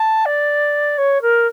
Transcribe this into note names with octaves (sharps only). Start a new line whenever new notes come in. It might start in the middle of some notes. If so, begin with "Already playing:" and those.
Already playing: A5
D5
C#5
A#4